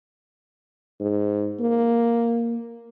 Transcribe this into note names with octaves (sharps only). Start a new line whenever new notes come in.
G#2
A#3